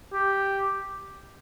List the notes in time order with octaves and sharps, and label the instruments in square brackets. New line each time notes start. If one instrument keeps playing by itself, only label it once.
[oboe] G4